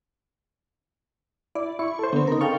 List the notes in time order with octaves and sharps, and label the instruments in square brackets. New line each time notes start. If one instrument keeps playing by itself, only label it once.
[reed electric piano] E4 [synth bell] D5
[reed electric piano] E4 [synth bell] C#6
[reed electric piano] A4 C5
[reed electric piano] D3 [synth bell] B3 C4
[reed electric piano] C#3 [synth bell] D#4 A#4
[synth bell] A4 F5 G5 [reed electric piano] C#6